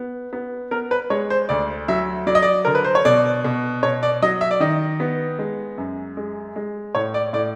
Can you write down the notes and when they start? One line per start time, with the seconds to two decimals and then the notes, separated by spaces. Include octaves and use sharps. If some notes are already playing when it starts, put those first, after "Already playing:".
Already playing: B3
0.33 B3
0.71 B3 A#4
0.91 B4
1.10 G#3 C#5
1.30 C5
1.49 D2 D5
1.88 F#3 E5
2.27 F#3 D5
2.35 D#5
2.42 D5
2.65 D3 A#4
2.75 B4
2.85 C5
2.95 C#5
3.05 B2 D5
3.44 B2
3.83 B2 C#5
4.03 D5
4.22 F#3 D#5
4.41 E5
4.51 D5
4.60 D#3 D#5
5.00 B3
5.39 G#3
5.78 F#2
6.17 G#3
6.56 G#3
6.95 A2 C#5
7.14 D5
7.33 A2 D5